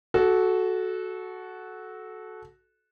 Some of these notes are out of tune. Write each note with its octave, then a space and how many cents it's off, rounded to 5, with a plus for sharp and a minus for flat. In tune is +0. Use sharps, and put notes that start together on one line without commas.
F#4 +0 A4 -20